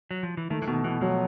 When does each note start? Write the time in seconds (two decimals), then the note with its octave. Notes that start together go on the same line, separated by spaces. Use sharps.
0.11 F#3
0.23 F3
0.37 E3
0.50 D#3 A3
0.62 E3
0.67 B2 D#3
0.84 B2 E3
1.01 F3 F#3